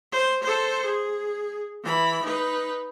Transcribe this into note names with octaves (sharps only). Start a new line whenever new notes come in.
C5
A4 C5
G#4
E3 B5
D#4 B4